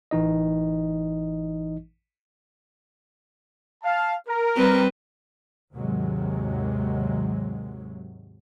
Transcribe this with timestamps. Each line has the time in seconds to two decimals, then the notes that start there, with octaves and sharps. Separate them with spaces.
0.11 A1 E3 D#4 D#5
3.83 F5 A5
4.27 A#4
4.56 G3 C4 B4
5.75 D#2 G#2 C3 D#3 F#3 G#3